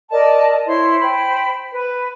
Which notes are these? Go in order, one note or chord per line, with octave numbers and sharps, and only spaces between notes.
A#4 D5 D#5 A5
E4 C5 C#5 C6
C5 G5 B5
B4